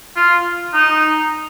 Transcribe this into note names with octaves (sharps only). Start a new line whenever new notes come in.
F4
D#4